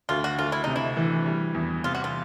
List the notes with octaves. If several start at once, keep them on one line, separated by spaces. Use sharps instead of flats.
D2 F4
F#4
D2 F4
E4
C3 D#4
E4
E3
G3
E2
C3 F4
F#4
F4